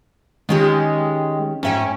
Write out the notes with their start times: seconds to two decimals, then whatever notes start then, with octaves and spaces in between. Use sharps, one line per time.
0.49 D#3 G#3 C#4 G4
1.63 G#2 C#4 E5 G5